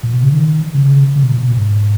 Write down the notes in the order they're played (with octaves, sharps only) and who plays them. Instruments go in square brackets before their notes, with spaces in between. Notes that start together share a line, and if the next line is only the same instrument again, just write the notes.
[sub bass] A#2
B2
C#3
D#3
C#3
C#3
B2
A#2
B2
G#2